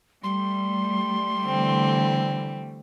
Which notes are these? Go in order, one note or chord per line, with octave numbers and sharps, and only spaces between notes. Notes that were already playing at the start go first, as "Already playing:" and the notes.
G3 A3 C6
D3 E3 C4